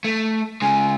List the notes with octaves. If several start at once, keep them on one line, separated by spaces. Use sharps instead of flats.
A3
C#3 G#3 G#5